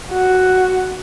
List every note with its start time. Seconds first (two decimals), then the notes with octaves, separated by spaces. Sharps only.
0.12 F#4